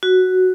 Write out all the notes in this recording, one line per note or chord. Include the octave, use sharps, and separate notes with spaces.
F#4